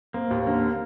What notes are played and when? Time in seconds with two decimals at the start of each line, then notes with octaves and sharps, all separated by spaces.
0.14 A#3 C4
0.31 D#2
0.47 D3 A#3